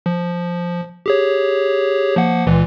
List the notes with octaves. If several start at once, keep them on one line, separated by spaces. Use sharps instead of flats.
F3
G4 G#4 C#5
F3 A#3 F#5
C#2 A#2 E3